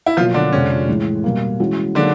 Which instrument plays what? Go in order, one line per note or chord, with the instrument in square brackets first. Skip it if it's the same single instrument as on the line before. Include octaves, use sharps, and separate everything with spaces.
[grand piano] E4
[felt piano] B2 F#3 A#3 [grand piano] F3 F4
[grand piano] D3 D4
[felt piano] F2 C3 F3 G#3 C4 [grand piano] C#4
[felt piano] A2 E3 G#3
B2 G3 A#3
E3 G#3 C#4 F#4
[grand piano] D3 D4 [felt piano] F#3 A#3 D#4 G#4